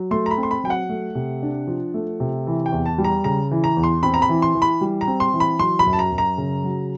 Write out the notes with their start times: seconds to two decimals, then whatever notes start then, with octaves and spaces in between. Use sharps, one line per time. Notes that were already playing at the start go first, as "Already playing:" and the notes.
Already playing: F#3
0.11 A3 C6
0.26 A#5
0.31 B5
0.38 C4
0.43 C6
0.51 B5
0.64 F#3 G5
0.70 F#5
0.89 A3
1.15 C3
1.42 D4
1.67 F3
1.94 A3
2.20 C3
2.47 E3
2.66 G5
2.72 E2
2.86 A5
2.98 G3
3.04 A#5
3.24 C#3 A#5
3.51 E3
3.64 A#5
3.77 E2
3.83 C6
4.03 C4 B5
4.14 A#5
4.22 B5
4.29 E3
4.42 C6
4.55 E3
4.62 B5
4.81 G3
5.01 A#5
5.07 C4
5.20 C6
5.33 E3
5.40 B5
5.59 F#3 C6
5.79 B5
5.86 F#2
5.93 A5
5.99 A#5
6.12 F#2
6.18 A#5
6.38 C#3
6.64 F#3